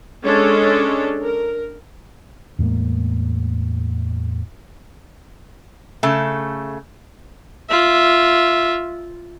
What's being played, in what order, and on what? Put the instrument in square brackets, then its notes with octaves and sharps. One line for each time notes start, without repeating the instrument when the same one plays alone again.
[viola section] G#3 C#4 D4 A4 C#5
A#4
[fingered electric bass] E2 A2 G#3 A#3
[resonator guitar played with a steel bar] C#3 A3
[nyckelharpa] F4 E5